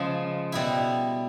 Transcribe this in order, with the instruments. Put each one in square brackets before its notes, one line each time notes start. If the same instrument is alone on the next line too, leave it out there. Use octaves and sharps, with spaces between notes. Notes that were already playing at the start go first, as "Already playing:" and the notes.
Already playing: [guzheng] C#3 F3 G#3
B2 G3 B3 E4